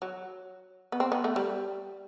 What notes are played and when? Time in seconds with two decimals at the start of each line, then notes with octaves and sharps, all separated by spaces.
0.02 F#3
0.92 B3
1.00 C4
1.12 B3
1.24 A3
1.36 G3